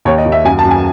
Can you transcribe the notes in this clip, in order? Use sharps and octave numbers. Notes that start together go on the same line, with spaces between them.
D#2 C#5
D#5
D#2
E5
F#2 G#5
A5
F#2
G#5